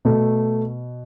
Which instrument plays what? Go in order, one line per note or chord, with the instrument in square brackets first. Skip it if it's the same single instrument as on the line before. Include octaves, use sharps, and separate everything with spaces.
[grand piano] B2 A3